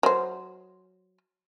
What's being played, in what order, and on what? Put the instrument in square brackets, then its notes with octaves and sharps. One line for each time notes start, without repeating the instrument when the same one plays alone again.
[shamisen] F#3 C5